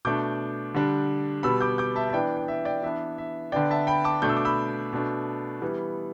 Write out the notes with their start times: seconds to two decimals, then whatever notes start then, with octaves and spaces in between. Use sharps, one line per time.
0.05 B2 A3 D4 D6 G6
0.74 D3 G3 D4
1.43 B2 G3 B3 B5 E6
1.61 D6 G6
1.78 D6 G6
1.96 E5 A5
2.10 E5
2.13 E3 B3 D4 D5 G5
2.37 G5
2.48 E5
2.65 D5 G5
2.82 E3 B3 D4 E5
3.18 E5
3.52 D3 B3 D4 D5 G5
3.71 E5 A5
3.87 G5 B5
4.04 A5 D6
4.22 B2 A3 D4 G6
4.29 E6
4.37 D6
4.45 B5 E6
4.93 B2 A3 D4
5.62 E3 G3 B3